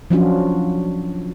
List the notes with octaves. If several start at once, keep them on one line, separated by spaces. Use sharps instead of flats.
F3 F#3 C#4 D4 F4 F#4